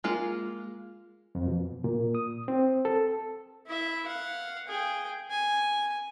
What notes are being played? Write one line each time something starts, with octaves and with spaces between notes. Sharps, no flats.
G#3 A#3 F4
F2
B2
A#2
D#6
C4
A4
E4 E5
F5 F#5
G#4 G5
G#5